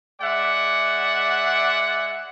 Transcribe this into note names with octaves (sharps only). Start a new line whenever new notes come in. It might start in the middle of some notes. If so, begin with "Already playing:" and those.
G#3 D5 E5 F#5